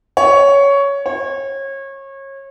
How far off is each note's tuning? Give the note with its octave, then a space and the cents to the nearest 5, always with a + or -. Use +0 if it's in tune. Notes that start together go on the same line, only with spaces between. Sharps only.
C#5 +10
C#5 -30